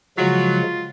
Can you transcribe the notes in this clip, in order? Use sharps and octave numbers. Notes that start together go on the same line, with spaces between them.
C#3 F3 F#3 G#3 F4